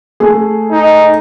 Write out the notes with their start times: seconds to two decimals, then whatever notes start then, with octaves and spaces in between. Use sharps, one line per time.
0.20 A3 G#4
0.71 D#4